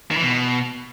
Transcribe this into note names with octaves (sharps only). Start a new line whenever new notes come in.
D#3
E3
B2